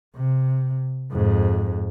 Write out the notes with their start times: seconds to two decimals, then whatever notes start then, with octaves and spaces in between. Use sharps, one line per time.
0.16 C3
1.11 F2 G#2